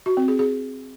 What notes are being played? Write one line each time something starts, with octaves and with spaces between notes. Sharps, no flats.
F#4
C4
G#4
G#4